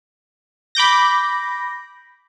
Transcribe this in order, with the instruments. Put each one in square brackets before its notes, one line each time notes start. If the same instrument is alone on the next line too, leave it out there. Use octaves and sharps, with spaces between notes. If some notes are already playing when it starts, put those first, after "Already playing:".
[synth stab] B5 D6 G6 A#6